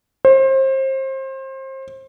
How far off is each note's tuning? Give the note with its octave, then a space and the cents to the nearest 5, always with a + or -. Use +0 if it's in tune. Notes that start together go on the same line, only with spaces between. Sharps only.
C5 +30